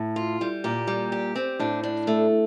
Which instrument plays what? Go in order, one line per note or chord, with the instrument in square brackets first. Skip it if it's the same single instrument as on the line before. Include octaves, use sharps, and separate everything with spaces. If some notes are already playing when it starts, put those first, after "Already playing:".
Already playing: [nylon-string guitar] A2
[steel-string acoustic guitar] F4
G3
[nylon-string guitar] A#2 [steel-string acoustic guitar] G4
[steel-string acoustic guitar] G3
G4
C4
[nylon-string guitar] A2 [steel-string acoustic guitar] D4
[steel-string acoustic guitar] D4
A3